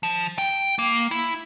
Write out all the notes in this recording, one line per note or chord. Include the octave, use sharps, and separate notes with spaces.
F3
G5
A#3
E4